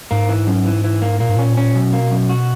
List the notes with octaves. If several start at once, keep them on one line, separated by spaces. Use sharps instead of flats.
G#2 A#3
E3
F#2
E3
E3
A#3
A#2 A#3
G#2
A#2 C#4
C#4
F#2 B2
A#3
F#2
F#4